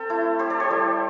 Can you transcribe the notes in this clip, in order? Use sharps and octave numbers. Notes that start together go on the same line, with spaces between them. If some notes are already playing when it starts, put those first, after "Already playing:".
Already playing: C4 A4 G5 A5
A3 E4
G4 C5
A4 D5
G4 C5
G3 E4